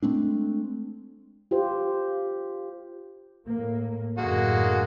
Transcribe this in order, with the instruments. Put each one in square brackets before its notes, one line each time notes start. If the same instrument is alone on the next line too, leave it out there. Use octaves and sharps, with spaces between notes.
[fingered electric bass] G#3 A3 C4 D4
[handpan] F4 G4 C5
[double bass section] A2 A#3
[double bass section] F#2 A2 D3 [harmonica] G#3 A#3 F#4